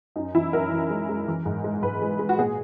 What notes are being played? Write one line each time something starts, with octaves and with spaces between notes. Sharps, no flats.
F#2 D#4
E3 E4
F#2 A#4
E3
G#3
G#3
E3
G#2
G#3
G#2 B4
G#3
G#3
F#4
A#2 G#4